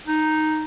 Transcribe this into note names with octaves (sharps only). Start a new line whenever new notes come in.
D#4